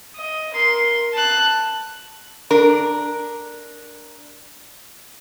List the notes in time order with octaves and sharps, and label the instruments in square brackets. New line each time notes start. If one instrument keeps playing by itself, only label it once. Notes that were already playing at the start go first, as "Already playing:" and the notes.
[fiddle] D#5
A#4 C6
A5 F#6
[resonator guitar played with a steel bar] D4 A#4